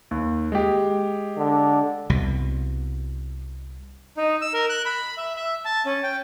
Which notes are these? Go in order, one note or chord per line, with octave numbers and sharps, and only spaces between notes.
D#2
G#3 G4
D3
C2 B2
D#4
E6
A#4
F#6
B5
E5
E5
A5
C#4
G5